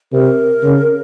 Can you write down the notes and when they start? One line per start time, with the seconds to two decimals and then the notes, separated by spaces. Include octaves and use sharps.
0.13 C3 A#4
0.63 C#3